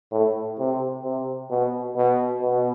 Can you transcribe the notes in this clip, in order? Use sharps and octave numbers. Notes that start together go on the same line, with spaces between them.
A2
C3
C3
B2
B2
B2